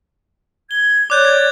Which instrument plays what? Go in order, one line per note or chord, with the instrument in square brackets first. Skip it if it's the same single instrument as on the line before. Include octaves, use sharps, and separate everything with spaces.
[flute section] G#6 [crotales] G7
[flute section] C#5 D5 [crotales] D6 F#6 G6
[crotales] G#6